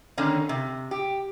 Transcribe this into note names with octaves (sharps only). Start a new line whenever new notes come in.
D3 D#3 A#3 C#4
C3
G4